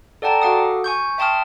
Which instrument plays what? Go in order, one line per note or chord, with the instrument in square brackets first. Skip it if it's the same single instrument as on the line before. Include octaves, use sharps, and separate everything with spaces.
[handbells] A4 D5 F#5 G5 A5 A#5
F#4 A4 F5 F#5 D6 D#6
G#5 C#6 G6
E5 G5 A5 C6 D#6 F6